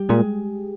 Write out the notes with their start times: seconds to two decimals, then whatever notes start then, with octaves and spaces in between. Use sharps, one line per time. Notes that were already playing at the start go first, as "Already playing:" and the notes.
Already playing: G3 G4
0.09 A#2 G#3 G#4